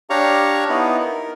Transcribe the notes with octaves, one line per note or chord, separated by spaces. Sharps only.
D4 G4 C#5 F5 A#5 C#6
B3 D#4 E4
A#4